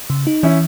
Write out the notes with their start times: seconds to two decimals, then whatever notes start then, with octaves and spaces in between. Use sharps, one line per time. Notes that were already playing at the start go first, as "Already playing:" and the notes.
0.10 C#3
0.27 D#4
0.43 E3 C#4 E4